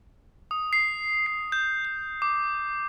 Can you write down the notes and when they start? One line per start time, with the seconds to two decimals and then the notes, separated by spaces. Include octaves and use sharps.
0.51 D#6
0.73 C7
1.26 C7
1.52 G6
1.85 G6
2.22 D6